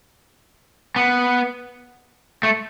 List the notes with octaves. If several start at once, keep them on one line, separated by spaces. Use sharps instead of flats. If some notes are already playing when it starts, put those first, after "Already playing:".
B3
A3